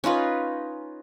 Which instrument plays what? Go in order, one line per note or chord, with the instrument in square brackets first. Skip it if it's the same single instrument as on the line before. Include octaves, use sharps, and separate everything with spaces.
[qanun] C#4 D#4 F4 B4